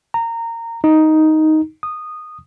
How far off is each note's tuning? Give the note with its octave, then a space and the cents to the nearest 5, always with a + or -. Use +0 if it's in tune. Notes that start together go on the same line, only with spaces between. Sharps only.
A#5 -20
D#4 +5
D#6 -15